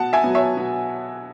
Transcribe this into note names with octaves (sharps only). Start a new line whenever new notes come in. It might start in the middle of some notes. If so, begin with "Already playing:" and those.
Already playing: B2 F#5 A5
E5 G#5
F#3 B3
C#5 E5
B2